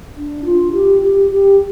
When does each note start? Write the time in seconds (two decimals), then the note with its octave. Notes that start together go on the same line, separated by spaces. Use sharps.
0.15 D4
0.45 F4
0.73 G4
1.02 G4
1.30 G4